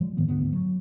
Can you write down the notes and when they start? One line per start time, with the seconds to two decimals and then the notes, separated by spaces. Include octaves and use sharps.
0.01 F3 G#3
0.17 G#2 D#3 A#3 B3
0.28 D2 G#2 D3 B3
0.53 F#3